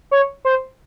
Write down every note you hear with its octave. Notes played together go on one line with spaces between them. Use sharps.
C#5
C5